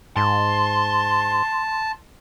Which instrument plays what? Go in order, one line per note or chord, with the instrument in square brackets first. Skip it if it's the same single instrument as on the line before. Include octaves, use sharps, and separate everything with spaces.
[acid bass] G#2 [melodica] A5 [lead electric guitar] C6